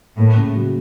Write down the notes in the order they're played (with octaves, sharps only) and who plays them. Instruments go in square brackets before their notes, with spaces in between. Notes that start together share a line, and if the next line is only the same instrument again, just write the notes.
[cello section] A2 [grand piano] A#3
[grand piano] C#3
F#3